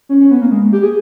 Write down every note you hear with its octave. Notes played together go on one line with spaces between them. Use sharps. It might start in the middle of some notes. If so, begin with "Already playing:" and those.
C#4
C#4
B3
A#3
G#3
G4
G#4